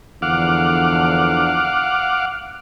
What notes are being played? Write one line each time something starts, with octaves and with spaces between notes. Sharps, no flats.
E2 D3 F3 F5 F#5 D6